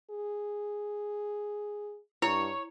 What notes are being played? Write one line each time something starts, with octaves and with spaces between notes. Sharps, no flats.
G#4
G2 E4 C#5